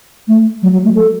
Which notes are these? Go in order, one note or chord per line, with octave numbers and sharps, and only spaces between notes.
A3
F#3
F#3
A3
A4